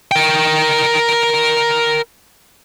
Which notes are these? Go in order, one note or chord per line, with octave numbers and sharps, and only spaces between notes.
A#4 G5